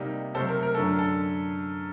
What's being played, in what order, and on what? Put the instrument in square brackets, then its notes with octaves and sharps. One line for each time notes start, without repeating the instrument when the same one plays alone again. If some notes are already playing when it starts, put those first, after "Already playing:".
Already playing: [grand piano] C3 G3 A#3 D#4
C3 F#3 A3 A4 C5
A#4
A#4
F#2 D3 F#3 A4
A4